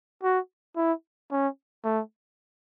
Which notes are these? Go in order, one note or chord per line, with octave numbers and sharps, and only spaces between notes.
F#4
E4
C#4
A3